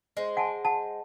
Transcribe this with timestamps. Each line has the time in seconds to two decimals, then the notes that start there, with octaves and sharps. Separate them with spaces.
0.17 G#3 C5
0.37 F#5 G#5 A5
0.65 F#5 A5